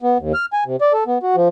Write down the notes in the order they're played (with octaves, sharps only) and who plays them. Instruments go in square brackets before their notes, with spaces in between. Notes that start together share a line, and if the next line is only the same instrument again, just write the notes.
[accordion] B3
D#2
F6
G#5
C3
D5
A4
B3
F#4
F3